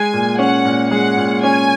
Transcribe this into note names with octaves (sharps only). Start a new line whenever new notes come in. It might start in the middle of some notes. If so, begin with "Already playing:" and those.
Already playing: G#3 G#5
A#2
C#4 F#5
A#2
G#3 F#5
A#2
C#4 G#5